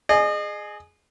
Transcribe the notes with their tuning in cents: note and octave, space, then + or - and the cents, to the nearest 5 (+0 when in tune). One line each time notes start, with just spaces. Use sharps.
G#4 +10 D#5 -35